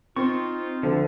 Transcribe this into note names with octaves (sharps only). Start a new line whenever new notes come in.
C4 D#4 F4 C#6
D2 D3 F3